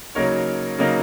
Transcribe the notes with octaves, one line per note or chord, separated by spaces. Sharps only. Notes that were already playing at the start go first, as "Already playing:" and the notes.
C#3 F#3 A#3 D#4 A#4 C#5
C#3 F#3 A#3 D#4